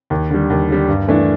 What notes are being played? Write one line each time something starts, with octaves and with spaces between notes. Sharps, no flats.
D#2
D3 G3
D#2
D3 G3
G2
E3 A3 D4